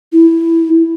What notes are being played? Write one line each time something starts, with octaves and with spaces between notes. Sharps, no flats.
E4